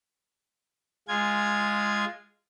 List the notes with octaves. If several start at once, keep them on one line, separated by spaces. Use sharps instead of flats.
G#3 F4 G#6